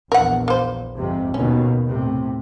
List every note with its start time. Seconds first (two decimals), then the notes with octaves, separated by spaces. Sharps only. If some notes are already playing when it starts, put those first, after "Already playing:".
0.12 A#1 E2 A#4 F#5
0.48 A#3 C5
0.95 F2 G#2 C3
1.34 D#2 B2 D#3 C#4
1.87 A2 C3